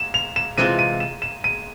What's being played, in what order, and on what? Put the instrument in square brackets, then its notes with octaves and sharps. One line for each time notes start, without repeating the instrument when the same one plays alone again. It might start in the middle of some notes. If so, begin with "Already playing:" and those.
Already playing: [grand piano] E7
F7
E7
[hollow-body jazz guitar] C3 E3 G#3 C4 F4 [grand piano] D#7
[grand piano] D#7
E7
E7
D#7